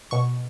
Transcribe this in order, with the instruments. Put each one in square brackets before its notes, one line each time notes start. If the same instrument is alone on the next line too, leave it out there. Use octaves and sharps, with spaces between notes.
[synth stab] B2 C#6